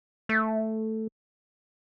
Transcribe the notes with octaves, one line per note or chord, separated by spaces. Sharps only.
A3